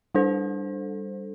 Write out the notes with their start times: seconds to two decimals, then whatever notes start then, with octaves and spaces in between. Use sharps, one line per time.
0.15 G3 D4 A4 C5